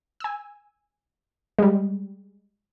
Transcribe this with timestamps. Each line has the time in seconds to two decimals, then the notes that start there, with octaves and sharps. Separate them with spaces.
0.20 G#5 E6
1.59 G3 G#3